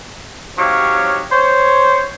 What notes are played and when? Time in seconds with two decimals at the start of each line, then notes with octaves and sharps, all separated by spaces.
0.58 F#3 C4 D#4 G4 C#5 F5
1.32 C5 C#5